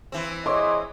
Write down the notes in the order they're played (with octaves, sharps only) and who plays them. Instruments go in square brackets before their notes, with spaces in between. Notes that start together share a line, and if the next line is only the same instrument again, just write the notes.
[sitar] E3 C4
[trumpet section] E4 G#4 D#5 [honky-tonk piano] C#5 C6 D6